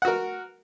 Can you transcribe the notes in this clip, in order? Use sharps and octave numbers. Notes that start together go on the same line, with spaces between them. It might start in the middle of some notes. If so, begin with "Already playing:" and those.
F#4 A#4 F#5